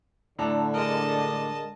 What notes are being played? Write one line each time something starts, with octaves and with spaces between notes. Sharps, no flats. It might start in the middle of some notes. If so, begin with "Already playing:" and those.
A2 D3 D4 A4 A#5
G#3 A#4 D#5 A5